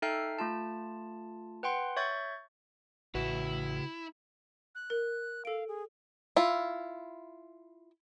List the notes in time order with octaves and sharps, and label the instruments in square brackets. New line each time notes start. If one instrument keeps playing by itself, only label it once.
[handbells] D#4 A4 E5 G5 F6 C7
A3 F4 A5
B4 F#5 G5 C6
C#5 E5 C#6 G6 A6
[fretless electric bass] A1 [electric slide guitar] C#3 B4 [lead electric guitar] E4 [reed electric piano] F#4
[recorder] F#6
[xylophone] A#4
[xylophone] A4 D7 [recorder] F5
[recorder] G#4
[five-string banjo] E4 F4